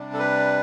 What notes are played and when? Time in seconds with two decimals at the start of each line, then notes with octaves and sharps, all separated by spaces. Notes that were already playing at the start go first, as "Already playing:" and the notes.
Already playing: C3 G3 D4
0.14 A4
0.19 B4